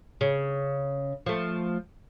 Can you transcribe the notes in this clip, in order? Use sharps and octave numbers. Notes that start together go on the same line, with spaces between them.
C#3
F3 A3